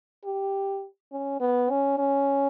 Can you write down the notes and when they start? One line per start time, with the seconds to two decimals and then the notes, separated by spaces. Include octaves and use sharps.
0.25 G4
1.12 C#4
1.40 B3
1.70 C#4
1.98 C#4